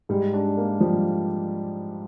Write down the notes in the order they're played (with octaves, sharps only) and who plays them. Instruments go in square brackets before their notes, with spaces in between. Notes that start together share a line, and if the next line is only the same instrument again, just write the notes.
[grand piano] G#2 [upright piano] G3
[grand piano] D4
A#3
[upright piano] F3 [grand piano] G3